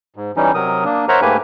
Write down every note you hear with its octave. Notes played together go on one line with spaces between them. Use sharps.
G#2
E3 G3 C#4 D#4
C3 F#3 A#4 D#6
A#3 D4
A#4 C5 C#5 E5 F#5 A#5
G#2 A3 A#3 G4 B4 G#5